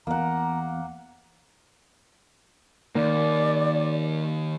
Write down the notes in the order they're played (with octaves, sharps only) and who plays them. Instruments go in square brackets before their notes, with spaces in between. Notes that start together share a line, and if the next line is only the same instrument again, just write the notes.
[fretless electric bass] E2 [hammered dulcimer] A#3 F#5 [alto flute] A#5
[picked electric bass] D#3 A#3 [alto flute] D5